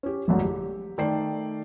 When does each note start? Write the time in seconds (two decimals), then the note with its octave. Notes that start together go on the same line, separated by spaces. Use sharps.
0.03 C#4 G4
0.27 E1 A1 F#2 D3
0.42 G4
0.98 D#3 A3 D5 G5 C7